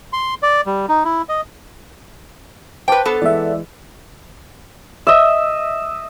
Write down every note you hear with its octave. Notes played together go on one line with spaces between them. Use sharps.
C6
D5
G3
D#4
E4
D#5
B4 C5 G5 A5 D6
B3 A4
E3 G#3 D5 E5
D#5 E5